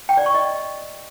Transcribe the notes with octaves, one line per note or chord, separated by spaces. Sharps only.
G5
D5
C#6
D#5